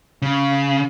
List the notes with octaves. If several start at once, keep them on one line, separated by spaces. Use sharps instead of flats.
C#3